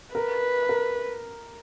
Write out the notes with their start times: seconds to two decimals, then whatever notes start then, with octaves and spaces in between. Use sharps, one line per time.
0.15 A#4 B4
0.69 A#4